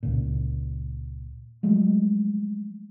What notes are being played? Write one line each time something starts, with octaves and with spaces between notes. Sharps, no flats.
C#2 A#2
F3 F#3 G#3 A3